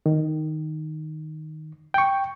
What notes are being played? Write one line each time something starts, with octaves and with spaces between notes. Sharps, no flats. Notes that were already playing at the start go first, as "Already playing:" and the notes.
D#3
G5 C#6